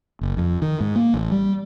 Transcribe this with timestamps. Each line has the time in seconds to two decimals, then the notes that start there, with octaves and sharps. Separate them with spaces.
0.21 F#1
0.37 F2
0.62 D#3
0.80 G#2
0.96 A#3
1.14 A1
1.32 G3